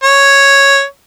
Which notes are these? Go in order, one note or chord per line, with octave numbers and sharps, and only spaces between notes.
C#5